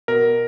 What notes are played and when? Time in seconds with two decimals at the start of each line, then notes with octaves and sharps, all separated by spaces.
0.08 B2 A#4